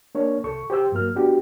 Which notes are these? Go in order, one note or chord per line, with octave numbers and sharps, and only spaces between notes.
A#3 D4 C#5
C2 A4 C#6
G4 C5 G5 E6
G2 F#3 A#3 F6
B3 D4 F#4 G4